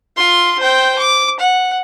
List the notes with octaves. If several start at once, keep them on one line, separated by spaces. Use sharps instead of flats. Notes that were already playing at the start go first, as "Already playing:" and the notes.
F4 C6
C5 G5
D6
F#5